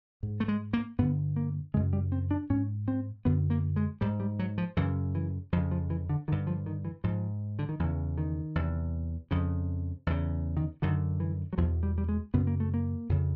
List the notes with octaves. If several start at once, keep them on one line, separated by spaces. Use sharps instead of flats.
G#2
A3
G#3
A#3
G2 D3 B3
A#3
F#2 C#3 G#3
G3
C4
D4
G#2 C#4
C4
F#2 D3 B3
A#3
G#3
G#2 G3
G3
F#3
F3
F#2 C#3 E3
E3
F2 C#3 F3
F3
E3
D3
G2 D3 D#3
F3
D#3
E3
G#2 F3
D3
D#3
E2 C#3 E3
D#3
E2 C3
F2 C#3
E2 C#3
D#3
F#2 D3 D#3
E3
F#3
E2 B2 F3
G3
G3
G#3
F#2 C#3 B3
A#3
A3
A#3
F2 C#3